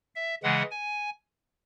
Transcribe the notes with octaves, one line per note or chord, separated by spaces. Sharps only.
E5
C#3 E3 G#3 F#5
G#5